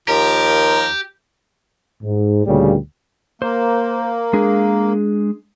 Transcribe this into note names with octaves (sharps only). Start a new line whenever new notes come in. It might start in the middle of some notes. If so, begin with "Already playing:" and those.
D#2 F3 G4 A#4
G#2
D2 A#2 C#3 G3
A#3 C5
G#3 D4 G#4